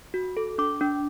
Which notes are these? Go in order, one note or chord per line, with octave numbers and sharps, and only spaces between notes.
F#4
A4
D4 D6
D4